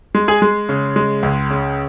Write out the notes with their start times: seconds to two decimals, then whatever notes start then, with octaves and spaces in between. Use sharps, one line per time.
0.15 G#3
0.28 G#4 G#5
0.42 G#3
0.69 C#3
0.96 G#3
1.23 C#2
1.50 C#3